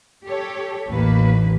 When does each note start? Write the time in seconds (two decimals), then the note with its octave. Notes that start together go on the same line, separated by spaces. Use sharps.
0.24 G4 A4 C#5
0.91 A1 D#2 A#3 B4